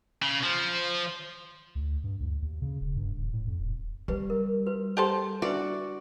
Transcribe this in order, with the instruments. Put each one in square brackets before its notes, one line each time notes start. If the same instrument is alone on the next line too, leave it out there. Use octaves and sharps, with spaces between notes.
[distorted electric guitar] C#3
F3
[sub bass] D2
G2
D2
D#2
C#3
E1
G2
D#1
A2
F2
D#1
[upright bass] G3 [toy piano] G4 B4
[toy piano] A#4
F#4 B4
[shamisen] G4 A4 C5
[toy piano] D4 B4 E5 [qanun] F#4 D5